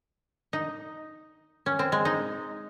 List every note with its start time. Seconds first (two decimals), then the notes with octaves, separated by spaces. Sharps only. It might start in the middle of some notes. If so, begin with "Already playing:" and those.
0.53 D#4
1.66 C#4
1.79 C4
1.92 G#3
2.05 D#4